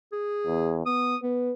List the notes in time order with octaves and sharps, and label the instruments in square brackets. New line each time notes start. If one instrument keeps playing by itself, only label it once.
[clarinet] G#4
[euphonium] E2
[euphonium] B3 [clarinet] D#6
[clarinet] B3 [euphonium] B4